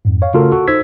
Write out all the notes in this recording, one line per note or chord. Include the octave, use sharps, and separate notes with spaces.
F2 G#2
C#5 F5
C#3 A3 F4 F#4 A4 A#4
F#4 A4
D#4 C5 E6 G#6 B6